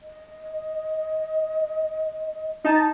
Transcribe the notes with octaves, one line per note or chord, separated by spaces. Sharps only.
D#5
D#4 D#5 A5